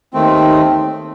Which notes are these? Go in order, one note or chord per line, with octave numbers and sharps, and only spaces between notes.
D#2 D#3 A3 C4